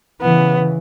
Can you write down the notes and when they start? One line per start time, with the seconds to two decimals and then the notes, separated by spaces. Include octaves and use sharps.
0.21 C#3 E3 B3